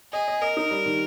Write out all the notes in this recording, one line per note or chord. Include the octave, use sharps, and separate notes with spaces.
G#4 D#5
D#5
A#4 D#5
D#4
G3
D#3